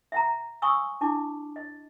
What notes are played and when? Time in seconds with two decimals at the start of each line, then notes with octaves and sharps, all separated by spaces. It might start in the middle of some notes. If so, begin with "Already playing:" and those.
0.12 E5 F#5 A#5
0.62 F5 G#5 C6 C#6 D#6 E6
1.01 D4 E4 A5 D6
1.56 D#5